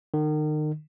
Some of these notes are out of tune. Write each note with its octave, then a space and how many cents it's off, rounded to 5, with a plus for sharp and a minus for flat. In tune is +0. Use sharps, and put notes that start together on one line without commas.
D#3 -35